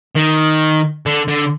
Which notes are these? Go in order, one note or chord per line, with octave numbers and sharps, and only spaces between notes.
D#3
D3
D3